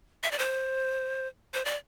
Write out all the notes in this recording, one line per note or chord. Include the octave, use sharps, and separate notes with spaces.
E5
D5
C5
C5
D5